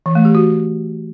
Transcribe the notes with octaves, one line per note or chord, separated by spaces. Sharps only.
E3
A3
G4
F#4